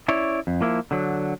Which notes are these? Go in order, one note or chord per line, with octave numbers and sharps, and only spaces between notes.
C#4 E4 C#5 D5
F2
F3 A#3 E4
D3 F#3